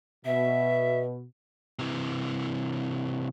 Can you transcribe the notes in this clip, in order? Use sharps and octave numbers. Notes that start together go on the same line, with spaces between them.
B2 E5
C3 E3